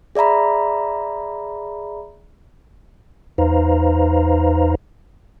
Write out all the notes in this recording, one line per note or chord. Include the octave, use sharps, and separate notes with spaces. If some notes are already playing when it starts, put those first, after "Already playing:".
G#4 D5 E5 A#5 B5
E2 D#4 B4 C5 F5 A#5